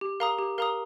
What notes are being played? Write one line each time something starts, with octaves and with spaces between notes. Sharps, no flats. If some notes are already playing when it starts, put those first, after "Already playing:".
G4
A#4 F5 A#5 D#6
G4
A#4 F5 A#5 D#6